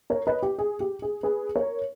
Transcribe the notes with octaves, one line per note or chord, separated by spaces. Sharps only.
A#4 C#5
B4 D#5
G4
G#4
G4
G#4
G#4 B4
A#4 C#5